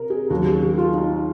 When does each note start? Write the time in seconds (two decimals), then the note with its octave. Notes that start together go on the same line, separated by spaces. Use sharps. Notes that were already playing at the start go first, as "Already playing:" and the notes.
Already playing: C3 A#4
0.10 G#4
0.30 D#2 C#3 F#3 F#4
0.46 G#4
0.62 F#4
0.78 F4
0.94 D#4